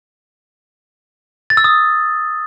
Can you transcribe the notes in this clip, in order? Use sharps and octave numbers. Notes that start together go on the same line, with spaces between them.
A6
E6
D#6